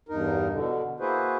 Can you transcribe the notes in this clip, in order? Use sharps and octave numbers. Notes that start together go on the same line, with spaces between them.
E2 G2 D#4 A#4
B2 D3
A#3 E4 F#4 G#4 B4 C5